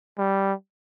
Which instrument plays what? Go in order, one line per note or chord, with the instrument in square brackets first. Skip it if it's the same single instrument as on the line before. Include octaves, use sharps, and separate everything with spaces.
[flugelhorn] G3